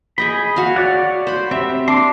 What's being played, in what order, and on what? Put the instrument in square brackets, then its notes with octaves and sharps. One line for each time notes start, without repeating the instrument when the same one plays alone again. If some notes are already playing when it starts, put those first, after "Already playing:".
[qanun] G#4 D#5 G5 [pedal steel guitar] B5
[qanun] F#4 F5
[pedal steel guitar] C#5 D5 F#5
[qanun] C5 B5
[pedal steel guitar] C4 G4 [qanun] E5
[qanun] D4 [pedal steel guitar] C6 D6